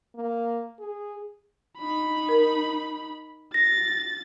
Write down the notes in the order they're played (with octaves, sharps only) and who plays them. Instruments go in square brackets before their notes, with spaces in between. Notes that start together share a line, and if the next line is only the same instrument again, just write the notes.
[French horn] A#3
G#4
[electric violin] D#4 B5
[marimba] A#4
[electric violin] A6 [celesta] A#6